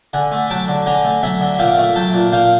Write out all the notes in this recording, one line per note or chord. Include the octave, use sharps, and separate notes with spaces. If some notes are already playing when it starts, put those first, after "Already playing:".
D3 F#5 G#5
A3
F#3 G5 A5
D3
D3 G#5 A#5
A3
F#3 E5 F#5
D3
A#2 F5 G5
A3
F#3 G5 A5
A#2
A#2 F5 G5